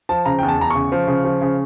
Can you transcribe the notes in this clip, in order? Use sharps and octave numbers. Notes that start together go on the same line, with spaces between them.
F3 A5
C#3 A#5
G5
E2
A5
E2 A#5
C#3 C#6
F3
C#3
F3
C#3